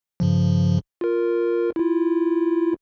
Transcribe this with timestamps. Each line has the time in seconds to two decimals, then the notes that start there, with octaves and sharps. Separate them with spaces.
0.20 G2 C#3 F3
1.01 F4 A#4
1.76 E4 F4